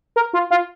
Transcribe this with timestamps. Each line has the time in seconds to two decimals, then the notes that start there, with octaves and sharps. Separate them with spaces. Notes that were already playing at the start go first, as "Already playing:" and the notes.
0.16 A#4
0.33 F4
0.50 F4